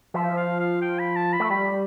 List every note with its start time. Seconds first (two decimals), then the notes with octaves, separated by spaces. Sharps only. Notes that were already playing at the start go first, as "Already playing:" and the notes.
0.14 F3 E5
0.37 F5
0.60 F5
0.82 G5
0.99 B5
1.16 A5
1.33 B5
1.40 A3
1.50 G3 B5